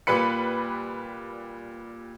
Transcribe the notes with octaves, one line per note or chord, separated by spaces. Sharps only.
A#2 G3 B4 B5 C#7